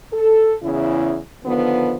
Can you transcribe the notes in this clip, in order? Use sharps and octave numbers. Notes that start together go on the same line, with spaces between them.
A4
E2 C#3 E4
D3 D#3 F3 B3